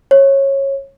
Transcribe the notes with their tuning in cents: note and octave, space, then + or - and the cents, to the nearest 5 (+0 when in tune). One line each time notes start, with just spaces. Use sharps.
C#5 -20